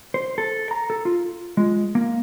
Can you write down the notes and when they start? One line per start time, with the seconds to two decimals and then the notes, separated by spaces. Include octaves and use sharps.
0.14 C5
0.38 A4
0.71 A#5
0.90 A4
1.05 F4
1.57 G#3
1.95 A#3